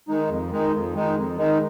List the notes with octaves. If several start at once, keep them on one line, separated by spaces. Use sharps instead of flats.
D#3 G#3 D#4
F2
D#3 G#3 D#4
F2
D#3 G#3 D#4
F2
D#3 G#3 D#4